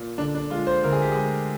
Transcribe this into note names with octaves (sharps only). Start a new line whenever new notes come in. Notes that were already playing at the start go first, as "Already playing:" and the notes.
Already playing: A#2
D3 D4
D4
G#3 F4
C5
D2 A#4
G#4
G4
G#3 G#4